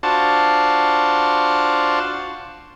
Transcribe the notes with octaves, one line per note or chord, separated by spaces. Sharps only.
D4 F4 F#4 C5 A5